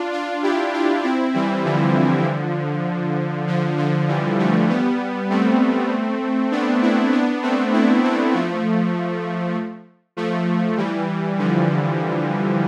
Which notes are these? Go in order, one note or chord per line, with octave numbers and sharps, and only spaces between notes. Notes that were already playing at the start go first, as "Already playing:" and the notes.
Already playing: D4 F4
D4 F4
E4 G4
D4 F4
C4 E4
E3 G3
D3 F3
D3 F3
D3 F3
E3 G3
F3 A3
G3 B3
A3 C4
B3 D4
C4 E4
B3 D4
A3 C4
C4 E4
A3 C4
F3 A3
F3 A3
E3 G3
D3 F3